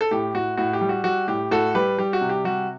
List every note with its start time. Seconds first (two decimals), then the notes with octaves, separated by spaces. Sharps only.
0.01 A4
0.11 A2 G4
0.34 A2 F#4
0.57 A2 F#4
0.73 G4
0.81 G3
0.89 F#4
1.04 G3 F#4
1.28 A2 G4
1.51 A2 F#4 A4
1.75 G3 G4 B4
1.98 G3 G4
2.13 F#4
2.21 C3
2.29 G4
2.44 G3 F#4